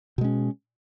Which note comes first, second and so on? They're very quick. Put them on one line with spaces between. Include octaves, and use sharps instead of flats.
B2 G#3 C#4